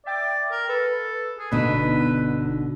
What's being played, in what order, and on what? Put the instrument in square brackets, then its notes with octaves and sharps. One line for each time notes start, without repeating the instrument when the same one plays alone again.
[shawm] D5 [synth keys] E5 G5 D6
[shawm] A#4
[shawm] A4 [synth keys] B4
[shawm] G#4
[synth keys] G1 B3 D#4 [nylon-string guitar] B2 D3 [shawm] B4